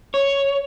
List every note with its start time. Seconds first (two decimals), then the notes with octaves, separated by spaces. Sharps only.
0.14 C#5